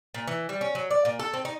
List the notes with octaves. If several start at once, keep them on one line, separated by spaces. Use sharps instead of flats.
A#2
E3
G3
C#4
F#3
D5
A#2
A4
C4
D#4